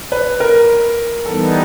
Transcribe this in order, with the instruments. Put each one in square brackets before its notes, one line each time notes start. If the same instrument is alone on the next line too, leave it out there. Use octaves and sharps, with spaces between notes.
[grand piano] B4
A#4
[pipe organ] E3 G3 B3 D#4 [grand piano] A4